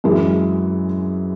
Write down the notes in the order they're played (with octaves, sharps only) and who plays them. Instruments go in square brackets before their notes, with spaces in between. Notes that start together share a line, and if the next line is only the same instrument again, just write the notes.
[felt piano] F#2 E3 G#3